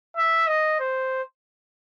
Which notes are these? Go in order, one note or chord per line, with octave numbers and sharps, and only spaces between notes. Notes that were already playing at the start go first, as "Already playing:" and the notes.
E5
D#5
C5